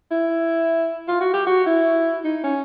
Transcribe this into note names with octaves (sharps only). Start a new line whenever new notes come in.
E4
F4
F#4
G4
F#4
E4
D#4
C#4